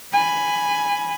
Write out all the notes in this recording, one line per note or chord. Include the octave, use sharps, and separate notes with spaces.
G#5 B5